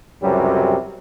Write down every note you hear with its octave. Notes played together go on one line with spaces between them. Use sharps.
C#2 F#2 C3 F#3 G3